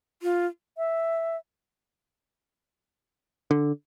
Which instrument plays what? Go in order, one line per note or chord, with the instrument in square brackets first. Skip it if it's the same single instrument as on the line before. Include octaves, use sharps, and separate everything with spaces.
[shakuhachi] F4
[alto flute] E5
[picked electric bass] D3